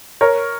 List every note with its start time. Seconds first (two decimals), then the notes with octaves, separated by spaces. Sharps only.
0.21 A#4 C#5